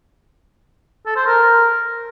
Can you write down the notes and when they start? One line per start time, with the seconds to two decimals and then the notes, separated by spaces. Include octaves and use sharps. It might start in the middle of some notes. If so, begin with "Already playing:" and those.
1.06 A4
1.16 C5
1.26 A#4